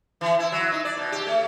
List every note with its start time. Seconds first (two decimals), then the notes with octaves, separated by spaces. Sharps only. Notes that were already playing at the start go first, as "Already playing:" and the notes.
0.21 E3
0.39 E4
0.52 F#3
0.72 D#4
0.85 D5
0.97 B2
1.12 G4
1.27 A3